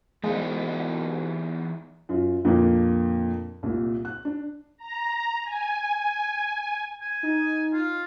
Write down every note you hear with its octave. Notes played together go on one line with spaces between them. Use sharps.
C2 B2 E3 G#3 B3 D#4
F#2 F4
F2 A#2 D3 A#3
C2 A#2
F#6
D4
A#5
G#5
G#5
D#4
F4